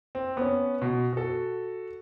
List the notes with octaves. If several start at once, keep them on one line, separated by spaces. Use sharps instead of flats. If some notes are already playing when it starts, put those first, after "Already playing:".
C4
B3 C#4
B2
F#4 A4